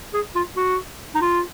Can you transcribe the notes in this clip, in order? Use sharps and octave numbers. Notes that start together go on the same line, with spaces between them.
G#4
F4
F#4
D#4
F4